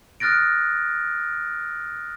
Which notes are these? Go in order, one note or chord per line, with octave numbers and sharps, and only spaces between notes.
D#6 F6 F#6 A6 A#6 D7